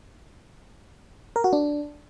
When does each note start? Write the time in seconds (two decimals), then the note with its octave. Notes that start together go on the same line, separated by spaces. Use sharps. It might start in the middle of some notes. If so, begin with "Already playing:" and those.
1.36 A#4
1.44 F#4
1.53 D4